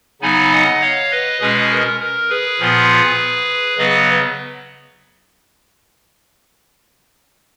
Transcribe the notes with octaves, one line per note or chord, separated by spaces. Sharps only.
C#3 F#3 B3 D#4 G#5 B5
D#5 F#5
C#5 F5
B4 D#5
B2 G#3 C#4 G#4 B4
A#4
A#4
G#4 B4
A#2 F3 B3 F4
C#3 F#3 B3 B4 D#5